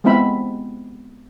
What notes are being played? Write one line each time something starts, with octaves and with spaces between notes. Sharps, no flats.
G#3 B3 C4 E4 E5 B5